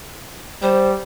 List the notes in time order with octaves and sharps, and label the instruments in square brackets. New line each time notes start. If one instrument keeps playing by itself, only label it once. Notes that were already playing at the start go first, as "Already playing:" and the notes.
[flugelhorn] G3 [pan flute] C5